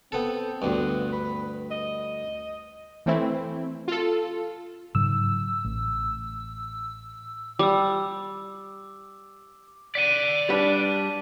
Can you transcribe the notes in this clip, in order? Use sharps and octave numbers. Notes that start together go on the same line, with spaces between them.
B3 C4 A4
D2 G2 B3
B4
D#5
E3 A3 C4 E4
F4 A4
G#2 C#3 F#3 E6
A1
G3 D6 E6
D5 F#5 B6 D#7
G3 D4 B4